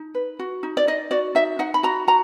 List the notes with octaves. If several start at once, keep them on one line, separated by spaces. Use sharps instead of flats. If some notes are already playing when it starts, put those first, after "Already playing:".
Already playing: D#4
B4
F#4
D#4
D5
D#4 D#5
F#4 D5
D#4 E5
D#4 F#5
B5
F#4 A#5
F#4 A#5